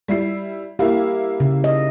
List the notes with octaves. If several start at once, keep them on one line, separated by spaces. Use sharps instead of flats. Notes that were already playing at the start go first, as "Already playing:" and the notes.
G3 E4 C7
A#3 E4 G4 F5
C#3
D#5